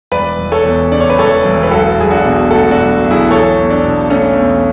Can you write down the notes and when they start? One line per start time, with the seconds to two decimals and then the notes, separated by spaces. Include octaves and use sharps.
0.12 E1 B4 D5
0.39 E1
0.52 A4 C#5
0.65 E2
0.92 C#3 D5
1.00 C#5
1.10 B4
1.18 E1 A4 C#5
1.45 E1
1.63 B4
1.71 B1 F#4 A4
1.98 B1 G#4
2.11 D4 F#4
2.25 B2
2.51 A3 F#4 A4
2.71 D4 F#4
2.78 B1
3.04 B1
3.11 E4 G#4
3.31 E2 A4 C#5
3.57 E2
3.70 D4
3.84 B2
4.10 A3 C#4
4.37 E2